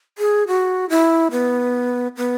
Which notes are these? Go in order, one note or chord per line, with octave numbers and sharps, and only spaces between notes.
G#4
F#4
E4
B3
B3